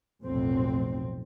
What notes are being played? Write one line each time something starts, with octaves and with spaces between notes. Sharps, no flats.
F1 B1 F2 A2 C4